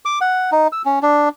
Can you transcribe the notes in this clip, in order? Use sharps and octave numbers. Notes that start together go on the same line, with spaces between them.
D6
F#5
D#4
E6
C#4
D4